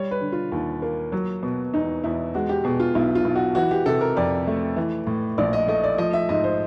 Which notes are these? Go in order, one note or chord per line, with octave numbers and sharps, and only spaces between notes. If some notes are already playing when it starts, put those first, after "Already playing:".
Already playing: G3 C#5
B4
D3
F4
D#2
A#3
F#3
B2
E2 D#4
E2 E4
G#3 F#4
G4
B2 G#4
F4
B1 E4
F4
B1
F#4
E3 F#4
G4
C3 A4
A#4
F2 D5
A3
E3
A2
A#1 D5
D#5
A3 D#5
D5
F3 D#5
E5
G#2 D#5
C5